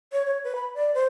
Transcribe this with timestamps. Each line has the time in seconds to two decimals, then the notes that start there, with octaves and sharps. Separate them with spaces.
0.12 C#5
0.26 C#5
0.44 B4
0.55 B5
0.75 D5
0.94 C5